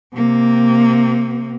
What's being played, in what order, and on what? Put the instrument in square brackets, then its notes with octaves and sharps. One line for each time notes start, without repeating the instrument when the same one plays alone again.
[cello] C3 A#3